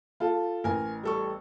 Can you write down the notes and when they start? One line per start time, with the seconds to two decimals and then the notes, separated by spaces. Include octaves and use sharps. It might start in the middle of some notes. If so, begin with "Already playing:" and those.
0.20 F4 A4
0.64 A1 A#4 G#5
1.03 G3 A4 C#6